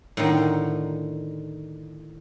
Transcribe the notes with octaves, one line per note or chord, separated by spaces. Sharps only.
A2 D3 D#3